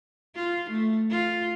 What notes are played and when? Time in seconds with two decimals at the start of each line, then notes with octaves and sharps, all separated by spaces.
0.35 F4
0.71 A3
1.11 F4